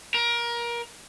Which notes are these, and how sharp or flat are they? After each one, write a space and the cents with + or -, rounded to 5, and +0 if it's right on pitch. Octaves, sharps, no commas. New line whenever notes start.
A#4 +25